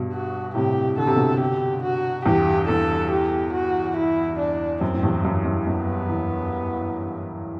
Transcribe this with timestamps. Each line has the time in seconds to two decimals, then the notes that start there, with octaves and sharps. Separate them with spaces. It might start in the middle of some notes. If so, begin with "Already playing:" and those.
Already playing: G2 B2
0.12 F#4
0.55 A2 C3 G4
0.98 D3 A4
1.07 C3
1.16 B2 D3
1.40 G4
1.83 F#4
2.25 E2 G2 G4
2.68 E2 A4
3.11 G4
3.53 F#4
3.96 E4
4.39 D4
4.81 F#2 C4
4.94 A2
5.03 E2 G2
5.25 F#2
5.45 F#2
5.67 F#2 B3
6.09 E2